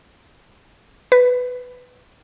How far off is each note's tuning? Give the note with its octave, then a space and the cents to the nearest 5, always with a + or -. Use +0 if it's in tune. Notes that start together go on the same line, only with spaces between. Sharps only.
B4 +10